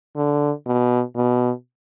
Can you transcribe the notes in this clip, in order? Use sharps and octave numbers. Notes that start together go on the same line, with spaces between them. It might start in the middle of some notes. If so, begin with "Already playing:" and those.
D3
B2
B2